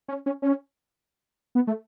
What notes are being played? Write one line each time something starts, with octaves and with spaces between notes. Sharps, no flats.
C#4
C#4
C#4
B3
A3